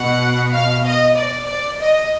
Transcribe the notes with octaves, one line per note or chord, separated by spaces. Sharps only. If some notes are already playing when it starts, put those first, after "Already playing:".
Already playing: B2 F#5
F5
D#5
D5
D5
D#5